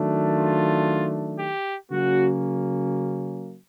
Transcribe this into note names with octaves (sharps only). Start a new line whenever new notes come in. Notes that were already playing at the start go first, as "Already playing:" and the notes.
Already playing: D#3 F#3 A3 D4
F4
G4
C#3 F#3 A#3 C#4 F#4